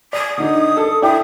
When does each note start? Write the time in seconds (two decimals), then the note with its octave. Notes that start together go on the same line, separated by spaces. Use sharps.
0.13 D5 D#6
0.38 D3 D#4
0.77 A4
1.02 E4 D5 G5 D#6